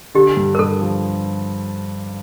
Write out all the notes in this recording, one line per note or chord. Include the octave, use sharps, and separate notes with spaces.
D3 G4
G2
A#4
G2 A4
F3